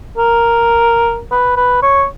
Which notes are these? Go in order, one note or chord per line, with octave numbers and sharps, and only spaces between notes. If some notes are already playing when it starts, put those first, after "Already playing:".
A#4
B4
B4
C#5